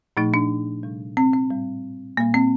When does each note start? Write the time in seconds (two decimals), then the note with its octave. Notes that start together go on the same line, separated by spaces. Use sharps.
0.17 A#2 F3 A3 D#4
0.34 D4
0.83 C3 G3
1.17 C4
1.33 C4
1.51 A2 G3
2.17 A#2 G3 A#3
2.34 C4